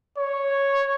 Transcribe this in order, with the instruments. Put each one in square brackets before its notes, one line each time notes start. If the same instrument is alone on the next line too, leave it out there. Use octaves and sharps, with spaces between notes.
[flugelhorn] C#5